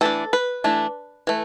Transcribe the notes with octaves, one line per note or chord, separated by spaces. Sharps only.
E3 A3 D4 A4
B4
E3 A3 D4
E3 A3